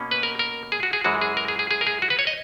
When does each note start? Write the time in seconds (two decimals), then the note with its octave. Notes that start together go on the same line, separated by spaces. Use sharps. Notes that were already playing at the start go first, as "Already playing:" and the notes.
Already playing: B2 A#3 C#4
0.11 B4
0.23 A#4
0.39 A#4
0.72 G#4
0.83 F#4
0.93 G#4
1.04 F#2 E3 G#3 F#4
1.21 G#4
1.37 A#4
1.48 G#4
1.59 G#4
1.71 G#4
1.81 A#4
1.87 G#4
2.02 F#4
2.10 B4
2.19 C#5
2.27 D#5